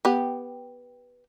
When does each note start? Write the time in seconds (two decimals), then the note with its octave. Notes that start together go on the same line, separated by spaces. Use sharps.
0.05 B3 G4